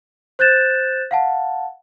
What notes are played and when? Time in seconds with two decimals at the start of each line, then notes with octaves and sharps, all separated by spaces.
0.39 C5 F#6 G6 A6 E7
1.11 F5 F#5 A5